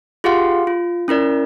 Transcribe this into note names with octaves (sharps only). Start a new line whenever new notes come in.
F4 G4 G#4 F5 F#5 C6
F4
C#4 E4 A#4 D5